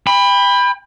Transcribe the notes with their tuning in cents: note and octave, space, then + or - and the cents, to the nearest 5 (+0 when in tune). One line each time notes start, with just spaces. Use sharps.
G5 +35 B5 +5